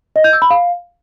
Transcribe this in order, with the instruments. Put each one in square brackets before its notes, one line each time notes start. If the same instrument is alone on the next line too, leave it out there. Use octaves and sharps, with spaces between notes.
[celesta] D#5
G6
E6
B5
F5